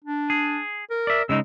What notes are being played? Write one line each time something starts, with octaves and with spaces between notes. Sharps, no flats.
D4
G#4
A#4
D5 E5
C#3 G#3 D#4 E6